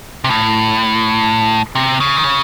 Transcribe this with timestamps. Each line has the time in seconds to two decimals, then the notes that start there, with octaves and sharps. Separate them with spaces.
0.24 C3
0.30 A2
1.75 C3
2.00 C#3
2.17 D#3
2.24 C#3